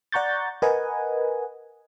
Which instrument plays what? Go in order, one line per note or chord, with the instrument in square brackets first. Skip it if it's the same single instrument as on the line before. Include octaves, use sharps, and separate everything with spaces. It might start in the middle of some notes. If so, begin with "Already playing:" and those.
[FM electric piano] D5 F#5 A#5 C#6 G6 A6
A#4 B4 D#5 F#5 G#5